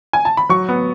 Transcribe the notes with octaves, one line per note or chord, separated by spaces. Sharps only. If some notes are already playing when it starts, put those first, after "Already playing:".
G#5
A5
B5
F#3 C#6
B3